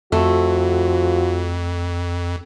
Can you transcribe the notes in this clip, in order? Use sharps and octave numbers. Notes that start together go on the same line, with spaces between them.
F2 F3 A3 F#4